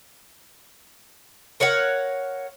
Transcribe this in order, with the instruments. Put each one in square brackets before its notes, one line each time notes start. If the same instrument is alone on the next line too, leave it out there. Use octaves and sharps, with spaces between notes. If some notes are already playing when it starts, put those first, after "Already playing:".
[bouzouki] A#4 C#5 F5 F#5